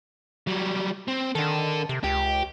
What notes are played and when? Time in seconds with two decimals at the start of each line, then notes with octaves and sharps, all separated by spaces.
0.47 F#3 G3
1.08 C4
1.35 D#3 D4 A4
1.89 C3
2.04 C#2 G4